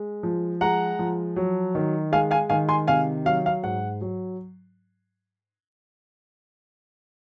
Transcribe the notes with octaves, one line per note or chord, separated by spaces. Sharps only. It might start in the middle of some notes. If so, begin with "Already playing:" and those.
Already playing: G#3
F3
G#3 F#5 A#5
F3
F#3
D#3
G#3 F5 G#5
F5 G#5
D#3 F5 G#5
G#5 C6
C3 F5 G#5
F#3 F5
F5
G#2 F#5
F#3